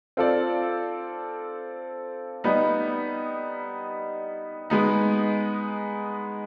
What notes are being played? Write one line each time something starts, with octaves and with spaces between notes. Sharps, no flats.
C4 F4 A4 D5
G3 B3 D#4
G#3 B3 D#4